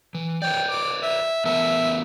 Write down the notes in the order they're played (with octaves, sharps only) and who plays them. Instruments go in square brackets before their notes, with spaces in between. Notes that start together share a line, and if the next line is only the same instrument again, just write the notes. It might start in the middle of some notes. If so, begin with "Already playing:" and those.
[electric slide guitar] E3
[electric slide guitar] B4 C#5 D5 [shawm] G5
[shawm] D6
E5
[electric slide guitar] E3 B3 A#4 [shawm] E5